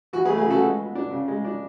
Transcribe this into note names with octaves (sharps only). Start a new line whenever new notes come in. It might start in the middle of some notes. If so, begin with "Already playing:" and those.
E3 F#4
G#4 B4
A3
G#4 B4
C#3 F#4 A4
G#3
B3
D4
C#3
G#3
D4